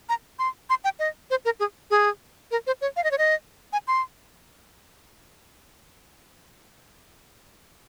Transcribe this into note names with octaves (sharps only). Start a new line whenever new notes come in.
A#5
C6
C6
G5
D#5
C5
A#4
G#4
G#4
A#4
C5
C#5
F5
D#5
C#5
D#5
G#5
C6